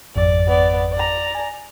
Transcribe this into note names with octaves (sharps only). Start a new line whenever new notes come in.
G#1 F2 D5
B3 D5
D5 A#5
G#5